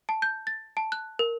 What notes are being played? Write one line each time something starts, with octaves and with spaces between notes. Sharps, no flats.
A5
G6
A6
A5
F#6
A#4